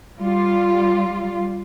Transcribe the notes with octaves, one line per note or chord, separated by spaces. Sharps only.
G3 F4